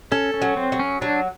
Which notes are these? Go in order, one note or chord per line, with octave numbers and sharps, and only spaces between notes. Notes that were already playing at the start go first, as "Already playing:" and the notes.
C#4 A4
C#4
F#3
C4
F#3
C#4
F#3 D4